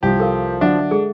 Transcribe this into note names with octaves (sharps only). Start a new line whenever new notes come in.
C2 F3 G4
A4 A#4 F5
D3 F#3 D4 E5 F#5
G#3 G#4 A4